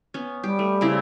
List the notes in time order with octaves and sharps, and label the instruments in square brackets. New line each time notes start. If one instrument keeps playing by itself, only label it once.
[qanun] B3 C#4
[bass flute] G3 [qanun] G4
[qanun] A3
C#3 C4 E4